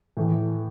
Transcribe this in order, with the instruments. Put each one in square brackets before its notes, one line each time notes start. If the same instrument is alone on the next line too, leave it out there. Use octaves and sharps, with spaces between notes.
[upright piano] A2 E3 A3